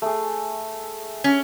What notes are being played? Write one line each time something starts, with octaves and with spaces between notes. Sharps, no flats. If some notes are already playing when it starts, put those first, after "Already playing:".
A3 G#4
C#4